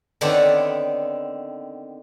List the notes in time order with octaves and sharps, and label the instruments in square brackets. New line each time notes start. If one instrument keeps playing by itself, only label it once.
[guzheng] D3 D#3 B3 C4 D4 C#5